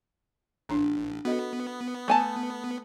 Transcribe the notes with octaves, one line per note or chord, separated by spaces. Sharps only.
A1 D4 A#5
B3 F#4 A4 D#5
A3 G#5 A5